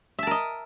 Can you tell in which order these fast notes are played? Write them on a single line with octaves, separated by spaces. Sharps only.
E5 A5 A#4 D#5